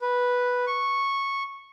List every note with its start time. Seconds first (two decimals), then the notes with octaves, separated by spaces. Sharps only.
0.01 B4
0.67 C#6